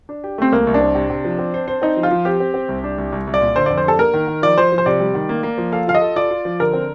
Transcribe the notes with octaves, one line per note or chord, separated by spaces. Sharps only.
D4
G4
A3 C4
C2 A#3
C2
D4
C4
C3
C3
F3
C4
C5
C5
C4 D#4
F3
F4
F3
C4 G4
C4
C4
C2
D4
C2
C2
C2
D5
A#2
D3 C5
F2 D5
C5
D4 A4
A#3 A#4
D#3
D#3
F3 D5
F3 C5
F3
C5
C3 D5
G3
D#3
A#3
A#3
F3
A4 F5
F4 F5
D#5
A4
F4 D5
F4
F3
D3 A#4
C4